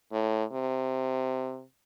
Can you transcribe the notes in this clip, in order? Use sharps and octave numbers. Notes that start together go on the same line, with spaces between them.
A2
C3